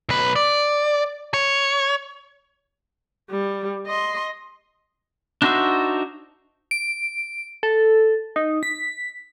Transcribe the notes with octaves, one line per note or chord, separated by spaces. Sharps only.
B1 B4
D5
C#5
G3
D#5 C6
D4 D#4 F#4 C5 E5
D7
A4
D#4
B6